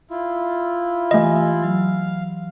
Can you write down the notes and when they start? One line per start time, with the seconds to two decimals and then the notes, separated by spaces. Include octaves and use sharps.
0.11 E4 F4
1.11 E3 A3 G4 D#5 G#5
1.63 F#3 F5